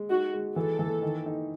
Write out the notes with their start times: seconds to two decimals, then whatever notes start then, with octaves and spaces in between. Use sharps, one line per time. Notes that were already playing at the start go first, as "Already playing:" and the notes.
Already playing: G#3
0.10 D#4 F#4
0.33 G#3
0.56 E3 A4
0.79 E3
1.02 D#3
1.26 D#4